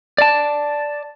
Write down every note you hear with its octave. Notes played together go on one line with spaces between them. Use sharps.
D5 A5